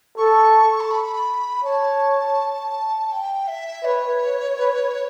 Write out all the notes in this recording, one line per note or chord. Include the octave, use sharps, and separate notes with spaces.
A4 C#6
A5
B5
C#5 A5
G5
E5
B4 C#5
B4